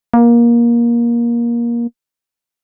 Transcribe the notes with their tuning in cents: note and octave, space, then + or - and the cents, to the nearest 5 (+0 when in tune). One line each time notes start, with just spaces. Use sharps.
A#3 +20